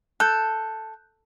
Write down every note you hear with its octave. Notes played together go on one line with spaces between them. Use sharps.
A4 F#6 G6